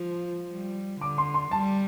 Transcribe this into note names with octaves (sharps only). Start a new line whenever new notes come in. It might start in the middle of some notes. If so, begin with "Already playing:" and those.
Already playing: F3
G3
D3 D6
C6
C6
G3 A5